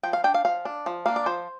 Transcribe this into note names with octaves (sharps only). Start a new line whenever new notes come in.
F3 G5
F5
D4 G5
F5
F3 F5
D4
F3
A#3 D4 F5
D5
F3 C5